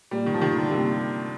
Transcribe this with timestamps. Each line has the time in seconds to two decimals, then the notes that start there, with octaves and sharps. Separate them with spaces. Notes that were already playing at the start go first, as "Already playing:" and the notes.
0.11 A#2 G3
0.26 D#3
0.34 F3
0.41 D#3 G3
0.56 D3
0.71 C3 A#3